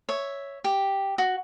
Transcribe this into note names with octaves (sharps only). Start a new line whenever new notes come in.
C#5 E5
G4
F#4